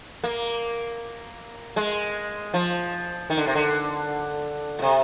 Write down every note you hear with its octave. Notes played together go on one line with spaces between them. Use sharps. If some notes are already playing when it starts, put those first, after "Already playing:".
A#3
G#3
F3
D#3
D3
C3
D3
A#2
C3